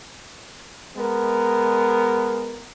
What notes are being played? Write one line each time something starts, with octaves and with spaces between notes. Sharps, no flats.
G#3 B3 A#4